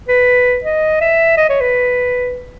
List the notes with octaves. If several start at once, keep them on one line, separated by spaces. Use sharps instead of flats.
B4
D#5
E5
D#5
C#5
B4